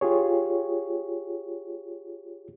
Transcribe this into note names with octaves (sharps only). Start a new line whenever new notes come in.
F4 G4 G#4 C#5